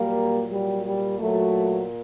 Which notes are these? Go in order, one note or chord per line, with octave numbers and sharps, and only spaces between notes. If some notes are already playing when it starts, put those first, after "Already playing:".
Already playing: A#2 F#3 G3 A#3
G3
G3
F#3 A3